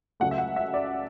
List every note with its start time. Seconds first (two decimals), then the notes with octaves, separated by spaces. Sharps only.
0.20 C#2 C#3 F#3 A3 F#5
0.31 E5
0.38 F#5
0.56 E5
0.74 D5